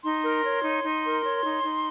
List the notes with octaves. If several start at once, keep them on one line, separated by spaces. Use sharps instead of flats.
D#4 C6
A#4
C#5
D#4
D#4
A#4
C#5
D#4
D#4